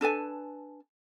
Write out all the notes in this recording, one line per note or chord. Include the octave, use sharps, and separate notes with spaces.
D4 A4 B4 G#5